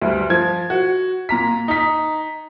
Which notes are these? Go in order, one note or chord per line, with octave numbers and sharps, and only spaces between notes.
D2 G2
F3 G#6
F#4
A#2 A#5 B6
D#4 B6